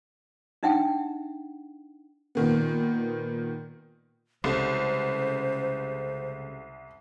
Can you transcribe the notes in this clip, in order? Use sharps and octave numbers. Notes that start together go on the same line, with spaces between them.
D4 D#4 E5 F#5 G5
A#2 D#3 B3
C2 C#3 G#3 C#4 G4 A4 C5